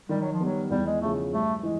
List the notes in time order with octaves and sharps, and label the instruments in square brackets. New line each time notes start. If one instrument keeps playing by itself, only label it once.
[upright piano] D#3 [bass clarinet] G3
[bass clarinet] F#3
F3
[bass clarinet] F#3 [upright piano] G3 B3
[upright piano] E2 [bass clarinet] G3
[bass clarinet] G#3
[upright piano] C#3 F3 [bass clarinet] A3
[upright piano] G2 [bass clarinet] A3
[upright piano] E3 [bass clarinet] G#3